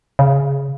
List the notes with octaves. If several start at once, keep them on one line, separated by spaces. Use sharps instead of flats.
C#3